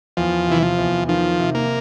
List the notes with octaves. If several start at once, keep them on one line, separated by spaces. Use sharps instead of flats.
E2 F3
C3 E3
F3
E2
D#3 F3
C3
A#3